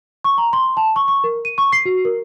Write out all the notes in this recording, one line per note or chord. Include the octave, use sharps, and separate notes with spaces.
C#6
A#5
C6
A5
C#6
C#6
A#4
D#7
C#6
C7
F#4
A#4